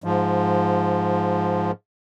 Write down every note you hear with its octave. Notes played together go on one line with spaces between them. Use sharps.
G#2 F3